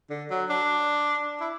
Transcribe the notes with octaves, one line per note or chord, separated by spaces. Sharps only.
D3
F#3
D4
E4